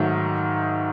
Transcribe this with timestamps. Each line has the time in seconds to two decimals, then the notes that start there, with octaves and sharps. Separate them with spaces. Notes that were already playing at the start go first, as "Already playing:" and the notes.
Already playing: G#2 D#3 F#3 A3